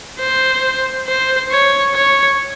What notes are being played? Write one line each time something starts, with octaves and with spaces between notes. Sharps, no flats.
C5
C5
C#5
C#5